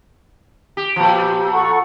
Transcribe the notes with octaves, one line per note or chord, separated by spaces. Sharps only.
G4
A#2 F3 G4
A4 F#5 C#6